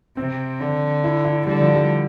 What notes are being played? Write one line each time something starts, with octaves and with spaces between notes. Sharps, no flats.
C3 C4
D3
E4
E4
D3 G3
F3
G3